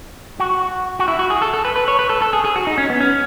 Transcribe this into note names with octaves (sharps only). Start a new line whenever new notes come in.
F#4
F#4
E4
F#4
G#4
A4
A4
B4
B4
C#5
B4
A4
A4
G#4
G#4
F#4
D#4
C#4
B3
C#4